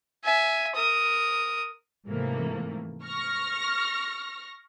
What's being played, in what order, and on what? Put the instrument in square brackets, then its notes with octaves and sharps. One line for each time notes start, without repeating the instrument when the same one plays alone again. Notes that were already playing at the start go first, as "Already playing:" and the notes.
[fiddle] E5 G#5
A#4 D#6
[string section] G#2 C3 E3 F3 A3 A#3
C#6 F6 A#6